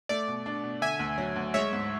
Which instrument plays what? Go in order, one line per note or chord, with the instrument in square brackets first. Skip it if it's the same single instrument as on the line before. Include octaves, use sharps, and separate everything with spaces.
[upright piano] A3 [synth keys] D5
[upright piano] B2
D4
B2
[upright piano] D3 [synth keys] E5 G#5
[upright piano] D2
F#3
D2
[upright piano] G#3 [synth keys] C#5 E5
[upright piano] G#2